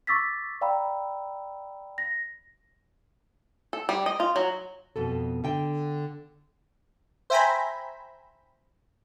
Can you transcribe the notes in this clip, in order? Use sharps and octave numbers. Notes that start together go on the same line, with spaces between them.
C#6 D6 E6 A6 B6
D5 F5 G5 A#5 B5 E6
A#6
A4
G3
D#5
F4
F#3
F2 B2 A4
D3 G5
C5 E5 G5 G#5 A#5 B5